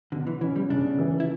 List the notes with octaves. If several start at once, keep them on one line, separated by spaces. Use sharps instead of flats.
B2 D3
E3
E3 C#4
G3
C#3 D4
E3
E4